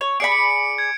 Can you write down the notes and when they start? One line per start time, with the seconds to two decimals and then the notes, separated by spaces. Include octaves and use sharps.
0.01 C#5
0.20 G#4 D5 B5 C#7 D7
0.32 C#7
0.78 G#6